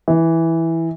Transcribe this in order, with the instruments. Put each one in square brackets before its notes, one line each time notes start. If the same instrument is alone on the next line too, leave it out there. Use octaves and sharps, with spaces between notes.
[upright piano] E3